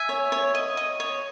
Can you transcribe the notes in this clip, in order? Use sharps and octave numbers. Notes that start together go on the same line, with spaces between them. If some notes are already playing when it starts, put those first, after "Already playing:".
Already playing: E5 G#5
C#5
C#5
D#5
D#5
C#5